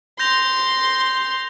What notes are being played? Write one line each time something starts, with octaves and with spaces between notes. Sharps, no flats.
C6 G6 A#6 F7